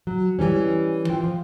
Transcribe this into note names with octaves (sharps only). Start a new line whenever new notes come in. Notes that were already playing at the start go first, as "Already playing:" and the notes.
F#3
E3 G3 C#4
E3 F4 G5
F3